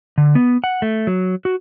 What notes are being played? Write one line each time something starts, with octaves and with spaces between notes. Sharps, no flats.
D3
B3
F#5
A3
F#3
F#4